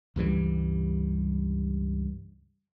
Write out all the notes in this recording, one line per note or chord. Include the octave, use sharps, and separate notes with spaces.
C#2 G2 E3 G3